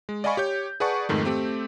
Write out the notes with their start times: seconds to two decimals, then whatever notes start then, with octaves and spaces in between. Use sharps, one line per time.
0.09 G#3
0.24 D5 D#5 F5 G#5 B5 C#6
0.37 G4 C#5 G6
0.80 G#4 B4 D5 F#5 A5 C#6
1.09 F2 G#2 D#3 A3
1.25 A3 C4 G4